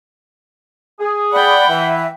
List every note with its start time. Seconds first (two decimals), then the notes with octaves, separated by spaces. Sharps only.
1.00 G#4
1.33 D5 F#5 G5 B5
1.69 E3 E5